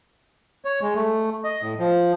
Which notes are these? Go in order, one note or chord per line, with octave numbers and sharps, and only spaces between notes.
C#5
G#3
A3
D#5
A2
F3